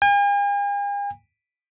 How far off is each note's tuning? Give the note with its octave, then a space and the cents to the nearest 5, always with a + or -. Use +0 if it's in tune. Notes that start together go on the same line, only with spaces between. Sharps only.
G#5 -45